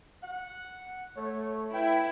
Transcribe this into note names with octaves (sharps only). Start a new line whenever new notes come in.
F#5
A3 C#5
E4 B4 G5